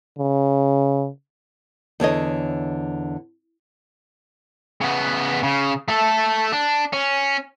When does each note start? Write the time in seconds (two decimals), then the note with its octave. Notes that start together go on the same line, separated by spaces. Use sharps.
0.19 C#3
2.00 E2 D3 C#5 D#5
4.81 C#3 B3
5.43 C#3
5.88 A3 A4
6.52 D4
6.93 C#4